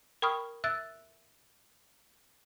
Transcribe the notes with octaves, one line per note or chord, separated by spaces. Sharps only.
A#4 G5 B5 C#6 D#6 F6
E5 E6 F#6 A6